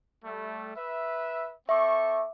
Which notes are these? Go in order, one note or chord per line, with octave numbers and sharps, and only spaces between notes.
G3 A3
B4 E5
C4 A4 E5 C#6 D6